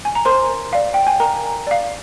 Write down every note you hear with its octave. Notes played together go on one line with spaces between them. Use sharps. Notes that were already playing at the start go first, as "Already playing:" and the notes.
G#5
A#5
A#4 C5 C6
D5 F5
G5
G#5
A#4 A#5
D5 F5